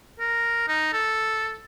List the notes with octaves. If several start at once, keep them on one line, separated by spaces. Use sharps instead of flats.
A#4
D#4
A4